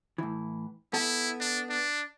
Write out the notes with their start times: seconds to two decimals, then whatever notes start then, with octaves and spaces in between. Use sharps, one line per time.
0.18 A2 E3
0.93 B3 E4 A4
1.41 D4
1.69 D4